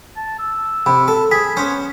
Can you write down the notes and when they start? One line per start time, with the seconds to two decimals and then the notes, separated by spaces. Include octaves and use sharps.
0.16 A5
0.39 E6
0.86 C3 B5
1.08 A4
1.31 G#4 B6
1.57 B3 C#4 C5